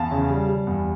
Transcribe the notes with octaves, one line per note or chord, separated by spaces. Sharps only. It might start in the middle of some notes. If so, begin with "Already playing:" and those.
Already playing: E2 F5 A5
C#3
G3
G3
E2